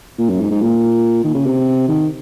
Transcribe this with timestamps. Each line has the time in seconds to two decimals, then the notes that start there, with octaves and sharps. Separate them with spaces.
0.19 A#2
0.30 F#2
0.40 G#2
0.51 G#2
0.61 A#2
1.24 D#3
1.35 C#3
1.46 C3
1.88 D#3